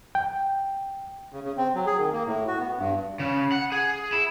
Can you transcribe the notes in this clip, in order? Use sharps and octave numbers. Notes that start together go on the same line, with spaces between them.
G5
C#3
C#3
C4
F#3
G#4
D#3
A#3
A2
F#4
B3
G2
C#3
F#5
G#4
E4